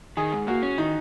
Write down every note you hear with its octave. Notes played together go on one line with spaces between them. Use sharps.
D#3 G#4
G#2
A#3 F#4
C#4
D#3 D#4